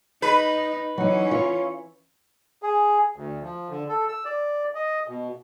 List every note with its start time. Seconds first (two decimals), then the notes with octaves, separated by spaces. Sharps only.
0.22 D#4 B4
0.98 E3 F#3 C#4 D#4
1.31 F4 C#5
2.63 G#4
3.16 D2
3.43 F3
3.70 D3
3.89 A4
4.08 E6
4.25 D5
4.75 D#5
5.08 B2